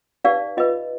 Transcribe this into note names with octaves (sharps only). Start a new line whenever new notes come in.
D#4 G4 B4 D5 F5
F4 B4 D#5